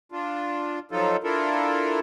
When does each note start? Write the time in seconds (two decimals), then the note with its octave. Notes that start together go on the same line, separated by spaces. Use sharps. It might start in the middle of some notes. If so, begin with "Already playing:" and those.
0.12 D4 F4
0.91 F3 F#3 D#4 F4 A4
1.24 D4 E4 F4 A4 A#4